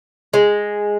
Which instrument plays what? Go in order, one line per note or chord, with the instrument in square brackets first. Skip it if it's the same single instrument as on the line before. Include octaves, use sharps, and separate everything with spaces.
[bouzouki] G#3